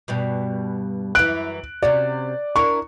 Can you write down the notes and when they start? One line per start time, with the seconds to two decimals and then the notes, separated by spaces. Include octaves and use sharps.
0.08 G2 B2 G3
1.15 F#2 E3 F#6 D7
1.83 C3 C#4 F#4 D5
2.56 D4 E4 A#4 C#6